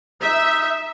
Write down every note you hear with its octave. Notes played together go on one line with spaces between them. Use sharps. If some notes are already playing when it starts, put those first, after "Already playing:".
D#4 E5